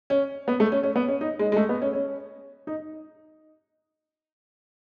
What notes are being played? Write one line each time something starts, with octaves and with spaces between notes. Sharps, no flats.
C#4
B3
A3
C#4
C#4
B3
C#4
D#4
G#3
G#3
A3
B3
C#4
C#4
D#4